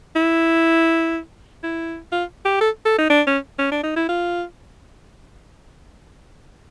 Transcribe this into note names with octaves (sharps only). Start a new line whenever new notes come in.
E4
E4
F4
G4
A4
A4
D#4
D4
C#4
C#4
D4
D#4
E4
F4